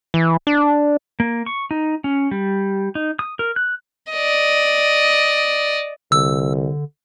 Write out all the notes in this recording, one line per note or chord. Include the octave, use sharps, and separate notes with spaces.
E3
D4
A#3
C#6
D#4
C#4
G3
D#4
D#6
A#4
F#6
D5 D#5
C2 D3 E6